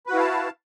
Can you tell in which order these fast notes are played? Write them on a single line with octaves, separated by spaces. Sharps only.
B4 F#4 E4 F5 A5